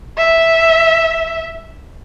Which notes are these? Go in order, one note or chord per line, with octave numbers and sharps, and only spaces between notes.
E5